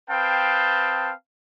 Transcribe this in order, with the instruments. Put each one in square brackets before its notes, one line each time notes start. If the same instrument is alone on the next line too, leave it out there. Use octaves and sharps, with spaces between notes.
[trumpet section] C4 B4 F5 G5 A5 D#6